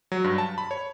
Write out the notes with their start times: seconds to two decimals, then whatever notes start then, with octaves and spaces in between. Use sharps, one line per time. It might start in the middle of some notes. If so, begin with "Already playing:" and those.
0.12 F#3
0.24 G2
0.38 A5
0.58 B5
0.71 C#5